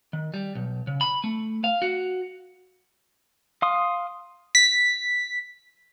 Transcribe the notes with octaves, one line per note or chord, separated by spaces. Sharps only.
D#3
G3
B1
C#3
B5
A3
F5
F#4
F5 C6 D#6
B6